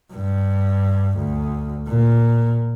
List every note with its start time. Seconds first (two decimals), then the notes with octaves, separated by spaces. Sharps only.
0.13 G2
1.18 D2
1.88 A#2